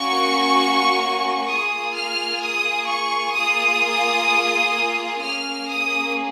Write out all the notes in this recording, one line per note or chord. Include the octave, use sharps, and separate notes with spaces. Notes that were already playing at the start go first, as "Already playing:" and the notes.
Already playing: A#3 C#4 F#4 C#6
A#3 F4 G#4 D#6
F6
D#6
C#6
A#3 F4 G#4 D#6
A#3 C#4 G#4 F6
D#6